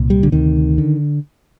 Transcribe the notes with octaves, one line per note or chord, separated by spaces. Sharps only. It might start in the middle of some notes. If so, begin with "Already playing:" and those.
Already playing: C2 A#2
G3
D3
D2 C3 D#3
D3